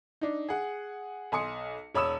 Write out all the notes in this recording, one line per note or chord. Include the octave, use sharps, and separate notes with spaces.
D4 D#4
G#4 F#5
B1 G#5 C6 D#6 C#7
E1 C#5 B5 D#6 E6 E7